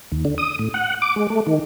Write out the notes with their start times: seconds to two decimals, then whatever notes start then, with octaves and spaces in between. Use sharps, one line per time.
0.12 D#2
0.25 D3
0.38 D#6
0.59 A2
0.74 F#5
1.02 D6
1.16 G#3
1.30 A3
1.47 D#3